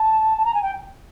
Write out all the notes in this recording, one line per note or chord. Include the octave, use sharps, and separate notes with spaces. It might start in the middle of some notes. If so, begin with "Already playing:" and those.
Already playing: A5
A5
A#5
G#5
G5